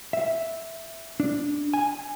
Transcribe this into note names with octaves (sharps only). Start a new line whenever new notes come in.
E5
D4
G#5